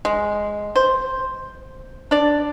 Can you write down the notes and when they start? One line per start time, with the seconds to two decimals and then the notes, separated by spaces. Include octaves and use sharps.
0.05 G#3
0.76 C5
2.11 D4 D5